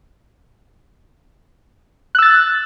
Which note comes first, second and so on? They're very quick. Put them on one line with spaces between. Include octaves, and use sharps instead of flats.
F#6 E6 A6